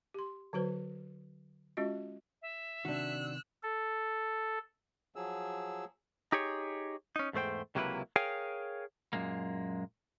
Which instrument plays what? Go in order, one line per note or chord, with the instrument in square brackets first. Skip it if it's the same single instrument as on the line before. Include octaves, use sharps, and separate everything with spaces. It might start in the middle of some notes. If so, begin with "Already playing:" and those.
[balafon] G4 C6
D3 F#3 F#4 B4 C5
G#3 C#4 F4 F#4 D#5
[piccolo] E5
[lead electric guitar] C3 D#3 [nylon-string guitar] D4 F#4 [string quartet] E6 F#6
[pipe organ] A4
[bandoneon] F3 F#3 G#4 E6
[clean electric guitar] D#4 G4 G#4 C#5
C#4 D#4
E2 G#2 A3 C5 G5
C#2 C3 F#3 A#3 E4 B4
G#4 A#4 C#5 F5 G5 G#5
F#2 A#2 G#3 A#3